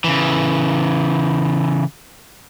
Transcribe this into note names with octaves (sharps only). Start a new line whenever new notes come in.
C#3 E3